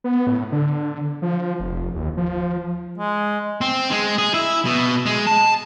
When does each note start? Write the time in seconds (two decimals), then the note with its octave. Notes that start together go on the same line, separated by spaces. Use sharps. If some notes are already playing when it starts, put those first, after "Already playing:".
0.04 B3
0.27 A2
0.52 D3
1.22 F3
1.60 F1
1.95 D#2
2.17 F3
2.98 G#3
3.61 C4
3.91 G#3
4.18 G#4
4.34 E4
4.65 B2
5.06 G#3
5.27 A5